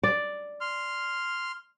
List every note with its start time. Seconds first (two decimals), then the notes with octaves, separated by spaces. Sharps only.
0.03 D5
0.61 C6 F6